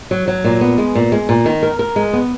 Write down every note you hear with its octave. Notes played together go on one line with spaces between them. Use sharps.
F#3
F#3
A#2
B3
G#3
A#2
G#3
A#2
D#3
A#4
A#4
G#3
B3